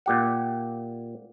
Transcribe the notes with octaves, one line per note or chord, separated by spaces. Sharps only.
A#2 G4 F#5